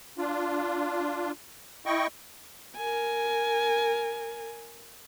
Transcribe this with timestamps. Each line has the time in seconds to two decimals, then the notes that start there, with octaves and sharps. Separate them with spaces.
0.18 D4 F4
1.86 E4 D#5 G5 C#6
2.76 A#4 G#5